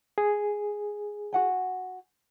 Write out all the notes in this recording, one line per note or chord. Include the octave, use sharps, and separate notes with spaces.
G#4
F#4 F#5 G#5